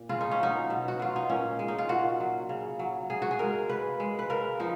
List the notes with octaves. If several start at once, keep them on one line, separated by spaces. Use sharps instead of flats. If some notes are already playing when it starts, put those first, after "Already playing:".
Already playing: A#2
C#3 F4
D#4
C#4
F#3 D#4
B2
F#4
F#3 F4
D#4
A#2 C#4
G#3
D#4
F4
A#2 F#4
F#3
C#3
F#3
C#3 G#4
F#4
G#4
G#3 A#4
C#3 B4
G#3
B4
C#3 A#4
F3 D#4